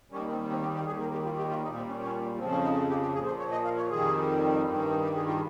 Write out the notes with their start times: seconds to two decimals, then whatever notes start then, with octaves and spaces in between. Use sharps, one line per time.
0.11 D#2 D#3 G3 C#4
0.31 C4
0.50 C4
0.61 G4
0.75 G4
0.87 D#2 D#3 G3 G#4
1.00 A#4
1.12 G4
1.25 F4
1.37 G4
1.50 F4
1.63 G3 D#4
1.68 A#2
1.76 C4
1.88 C#4
2.00 C#4
2.38 F2 C#3 F3 C4
2.51 C#4
2.63 D#4
2.89 G4
3.01 G4
3.15 A#2 F3 G#4
3.26 C5
3.39 C#5
3.52 D#5
3.64 F5
3.77 C#5
3.90 F2 D#3 G3 G#4
4.65 G2 D#3 G3 C4
4.78 C#4
4.90 D#4
5.04 G4
5.16 G#4
5.28 F4